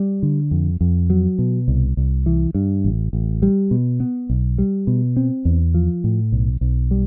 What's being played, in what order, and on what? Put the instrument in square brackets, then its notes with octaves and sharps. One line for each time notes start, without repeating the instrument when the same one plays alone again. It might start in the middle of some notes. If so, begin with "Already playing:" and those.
Already playing: [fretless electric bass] G3
D3
F2
F2
F#3
B2
C2
C2
E3
G2
A1
A1
G3
B2
B3
B1
G3
B2
C4
E2
F3
A2
B1
B1
G3